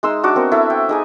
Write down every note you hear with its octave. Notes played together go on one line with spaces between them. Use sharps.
G#3 D#4 C6 E6
D4 F#4 D6
B3 C4 A#4
E4 A4
G5
D#4 G#4 G#5